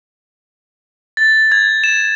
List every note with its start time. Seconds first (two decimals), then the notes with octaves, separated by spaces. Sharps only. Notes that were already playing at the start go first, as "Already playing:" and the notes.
1.17 A6
1.52 G#6
1.84 E7